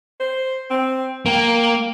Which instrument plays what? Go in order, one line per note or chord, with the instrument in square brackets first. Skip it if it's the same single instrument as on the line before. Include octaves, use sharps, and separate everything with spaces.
[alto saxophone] C5
C4
[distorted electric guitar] A#3 [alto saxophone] G5